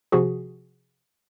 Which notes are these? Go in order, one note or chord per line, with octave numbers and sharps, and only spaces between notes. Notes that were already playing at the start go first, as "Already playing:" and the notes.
C3 F3 F#4 G#4